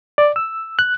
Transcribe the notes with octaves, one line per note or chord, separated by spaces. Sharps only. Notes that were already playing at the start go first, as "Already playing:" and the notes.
D5
E6
F#6